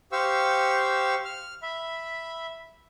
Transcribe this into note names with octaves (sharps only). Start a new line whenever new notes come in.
G4 C5 F5 C#6 E6
F6
E5 B5